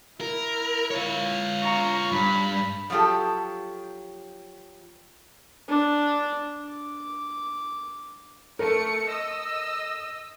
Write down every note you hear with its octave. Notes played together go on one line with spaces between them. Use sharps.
E4 A#4
F4 C#5
A#5 C#6
G2 B5
F3 F#3 F4 G4 A4
D4
D6
A3 A4 A#4 C#7
D#5 E6